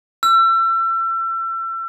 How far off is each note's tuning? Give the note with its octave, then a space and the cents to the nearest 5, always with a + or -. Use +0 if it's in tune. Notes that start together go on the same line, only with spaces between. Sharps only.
E6 +35